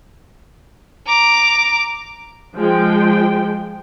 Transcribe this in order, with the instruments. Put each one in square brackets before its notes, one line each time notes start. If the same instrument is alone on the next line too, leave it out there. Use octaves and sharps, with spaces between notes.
[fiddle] A#5 D6
[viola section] F3 G#3 G5